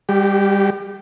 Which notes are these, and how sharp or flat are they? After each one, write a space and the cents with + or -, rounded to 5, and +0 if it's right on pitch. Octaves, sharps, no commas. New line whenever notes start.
G3 +30 G4 -20